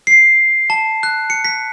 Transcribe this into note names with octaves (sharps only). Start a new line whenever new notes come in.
C7
A5
F#6
C#7
B6